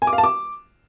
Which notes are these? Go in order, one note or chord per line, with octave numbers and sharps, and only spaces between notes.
G#5
D6
F5
A5
D6